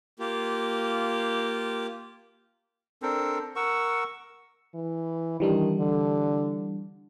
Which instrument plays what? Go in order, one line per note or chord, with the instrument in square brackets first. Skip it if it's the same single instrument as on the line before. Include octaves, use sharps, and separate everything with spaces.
[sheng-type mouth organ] A#3 F4 G4
[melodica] C4 D4 A4 A#4
A#4 F#5 C#6 E6
[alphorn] E3
[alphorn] D#3 [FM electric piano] E3 G3 D4
[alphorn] D3